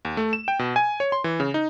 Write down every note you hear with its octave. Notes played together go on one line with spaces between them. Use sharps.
D#2
A3
E7
G5
B2
G#5
C#5
C6
E3
C#3
D#4